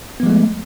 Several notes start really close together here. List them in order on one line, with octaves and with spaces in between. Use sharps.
B3 F3 G#3 A3